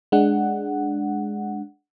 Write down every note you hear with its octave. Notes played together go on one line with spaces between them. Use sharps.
G#3 D4 F#5